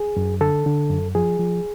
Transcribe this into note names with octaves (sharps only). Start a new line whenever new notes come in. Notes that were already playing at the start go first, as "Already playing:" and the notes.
Already playing: G#4
F#2
D3 A4
D3
F#2
F3 G#4
F3